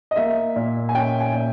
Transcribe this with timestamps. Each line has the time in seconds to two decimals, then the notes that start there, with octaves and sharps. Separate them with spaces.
0.11 D#5
0.16 A#3 E5
0.56 A#2
0.89 G#5
0.95 C#4 G5
1.20 G#5
1.34 A#2